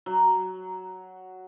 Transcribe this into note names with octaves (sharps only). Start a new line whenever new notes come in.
F#3